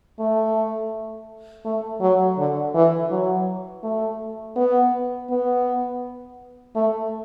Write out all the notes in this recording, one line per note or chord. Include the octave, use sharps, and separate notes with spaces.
A3
A3
F#3
D3
E3
F#3
A3
B3
B3
A3